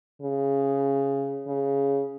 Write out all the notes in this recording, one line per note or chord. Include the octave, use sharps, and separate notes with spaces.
C#3
C#3